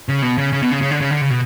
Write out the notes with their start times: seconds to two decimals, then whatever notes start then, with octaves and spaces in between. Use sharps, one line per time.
0.09 C#3
0.22 B2
0.38 C#3
0.53 C#3
0.62 B2
0.71 C#3
0.82 C#3
0.91 D3
1.01 C#3
1.11 D3
1.21 C#3
1.30 B2